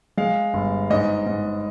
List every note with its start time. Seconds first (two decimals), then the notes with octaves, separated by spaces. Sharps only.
0.17 G#3 F5
0.54 G1
0.90 G#2 D#5
1.26 G#2